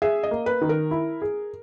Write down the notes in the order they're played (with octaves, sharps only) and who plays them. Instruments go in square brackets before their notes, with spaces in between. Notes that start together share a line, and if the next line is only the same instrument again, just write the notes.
[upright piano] G#4 [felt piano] E5
[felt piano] D#5
[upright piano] A#3
[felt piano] B4
[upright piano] D#3
[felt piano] A#4
[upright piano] E4
G#4